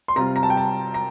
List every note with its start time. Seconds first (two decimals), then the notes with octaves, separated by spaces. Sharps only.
0.08 C6
0.16 C3 G3 C4 F4 A#5
0.36 A#5
0.43 A5
0.50 G5
0.57 A5
0.94 A#5